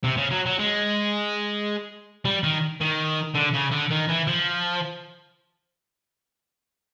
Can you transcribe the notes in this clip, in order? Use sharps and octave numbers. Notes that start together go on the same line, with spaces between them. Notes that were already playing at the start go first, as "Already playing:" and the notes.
C3
C#3
F#3
F#3
G#3
G3
D#3
D#3
D3
C#3
D3
D#3
E3
F3